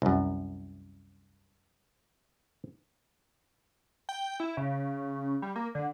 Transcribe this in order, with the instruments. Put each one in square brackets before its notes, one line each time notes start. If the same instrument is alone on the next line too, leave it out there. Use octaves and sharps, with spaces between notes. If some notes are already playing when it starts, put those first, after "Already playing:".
[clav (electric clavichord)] C2 F#2
[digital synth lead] G5
E4
C#3
G3
A#3
D3